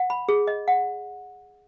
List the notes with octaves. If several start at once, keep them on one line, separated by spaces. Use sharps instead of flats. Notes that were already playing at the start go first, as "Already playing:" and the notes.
Already playing: F#5
B5
G#4
D#5
F#5